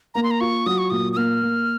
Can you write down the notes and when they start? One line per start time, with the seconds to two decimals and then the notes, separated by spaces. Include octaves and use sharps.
0.15 A#3 A#5
0.23 C6
0.31 A#5
0.40 F4 C#6
0.66 F#3 D#6
0.78 C#6
0.90 A#2 D#6
1.13 D#6
1.16 A#3 F6
1.42 A#3